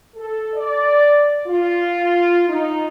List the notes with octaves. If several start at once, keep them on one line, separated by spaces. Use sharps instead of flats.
A4
D5
F4
D#4